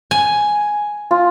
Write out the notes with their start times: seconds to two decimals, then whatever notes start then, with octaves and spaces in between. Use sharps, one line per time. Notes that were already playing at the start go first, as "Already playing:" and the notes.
0.11 G#5
1.11 F4